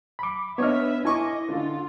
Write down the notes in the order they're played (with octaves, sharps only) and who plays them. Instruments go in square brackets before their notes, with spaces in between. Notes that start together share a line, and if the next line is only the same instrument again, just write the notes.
[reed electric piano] B5 D6
[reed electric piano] B3 D4 F6 [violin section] B4 E5 [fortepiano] C#5 D#5
[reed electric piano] E4 [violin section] D#5 [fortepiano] G#5 C#6 D6
[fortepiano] D3 [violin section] F4